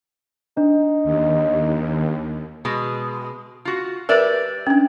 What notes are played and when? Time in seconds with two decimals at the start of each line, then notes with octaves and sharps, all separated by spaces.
0.57 D4 D#4
1.04 D#2
2.65 B2 G#3
3.65 F4 F#4
4.09 G3 A#4 B4 D5 E5
4.67 C#4 D4